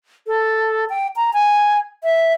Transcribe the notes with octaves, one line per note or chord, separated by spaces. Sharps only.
A4
G5
A#5
G#5
E5